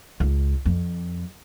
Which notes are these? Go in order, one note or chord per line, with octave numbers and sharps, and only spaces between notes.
C#2
F2